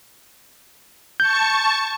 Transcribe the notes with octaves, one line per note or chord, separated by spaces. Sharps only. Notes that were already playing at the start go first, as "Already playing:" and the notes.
A5 C#6 G6 C#7